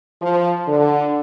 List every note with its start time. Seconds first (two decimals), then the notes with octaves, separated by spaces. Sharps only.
0.22 F3
0.66 D3